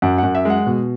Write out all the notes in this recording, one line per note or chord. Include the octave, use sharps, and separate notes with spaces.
F#2 F#5
F#5
F#2
E5
G#3 F#5
B2